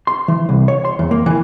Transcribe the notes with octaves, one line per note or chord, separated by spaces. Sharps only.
C6
E3
C2
C#5
C6
E2
A#3
E3